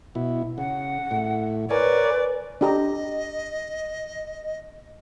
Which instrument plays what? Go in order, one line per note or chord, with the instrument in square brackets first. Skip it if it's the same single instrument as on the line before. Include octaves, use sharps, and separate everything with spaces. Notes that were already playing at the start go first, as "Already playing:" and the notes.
[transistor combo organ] B2 E4
[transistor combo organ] C#3 [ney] F#5
[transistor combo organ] A2
[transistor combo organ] A#4 C#5 G#5 [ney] B4 [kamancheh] D5
[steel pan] D4 G4 A#5 [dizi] D#5